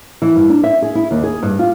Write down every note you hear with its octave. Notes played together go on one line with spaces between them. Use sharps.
E3
G2
D4
E5
G#4
E4
D#2
G#4
G2
F4